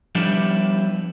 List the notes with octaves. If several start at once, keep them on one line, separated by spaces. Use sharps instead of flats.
F3 G3 B3 D4 E4 G4